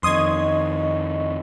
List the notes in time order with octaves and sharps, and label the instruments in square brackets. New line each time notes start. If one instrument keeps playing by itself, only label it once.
[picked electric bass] F2 D#3 [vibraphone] D#5 C#6 [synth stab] C6 D#6 G#6